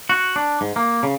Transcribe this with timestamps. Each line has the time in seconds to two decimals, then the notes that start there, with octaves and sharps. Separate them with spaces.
0.09 F#4
0.36 D4
0.61 G#2
0.76 A#3
1.03 C#3